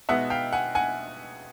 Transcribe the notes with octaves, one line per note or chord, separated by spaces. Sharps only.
B2 G#3 B3 D#4 E5 F#5
F5 G5
F#5 G#5
F#5 G#5